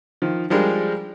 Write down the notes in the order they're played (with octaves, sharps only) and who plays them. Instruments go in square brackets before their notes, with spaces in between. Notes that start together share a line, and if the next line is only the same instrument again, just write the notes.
[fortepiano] D#3 F3
F3 G3 G#3 D4 A#4